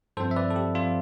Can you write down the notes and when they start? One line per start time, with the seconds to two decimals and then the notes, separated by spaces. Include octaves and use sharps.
0.17 G2 F3 C4 A4 C5
0.31 E5
0.36 B4 D5
0.50 A4
0.56 G4
0.75 F3 C4 F4